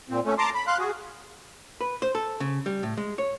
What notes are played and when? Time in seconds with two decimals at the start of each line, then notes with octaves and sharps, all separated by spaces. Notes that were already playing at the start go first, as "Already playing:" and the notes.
0.09 A#2 C4
0.25 A3 C#4
0.38 A5 A#5 C6 D6
0.55 B5
0.67 F5 C6 F#6
0.79 F#4 G#4
1.81 B4
2.02 C5
2.15 A4
2.40 C#3
2.66 G3
2.83 A2
2.97 G#3
3.18 C#5